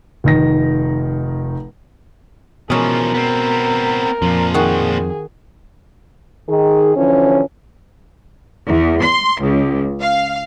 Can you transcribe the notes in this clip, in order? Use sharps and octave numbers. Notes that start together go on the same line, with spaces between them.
F1 D#3 A#6
B2 E3 F3 G#3 C#4 A#4
B3 C4
F2 A#2 F3
D#3 F#4 G#4
D#3 G#4
D3 E3 F3 C#4
E2
C6
C#2
F5